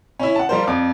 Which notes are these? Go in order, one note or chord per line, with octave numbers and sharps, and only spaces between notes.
C#4 E4
F#5 A5
F3 G3 F4 A#4 C5
F2 D5 D6